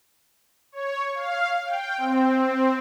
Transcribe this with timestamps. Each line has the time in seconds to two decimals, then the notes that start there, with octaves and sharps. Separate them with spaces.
0.72 C#5
1.15 F5
1.66 G5
1.98 C4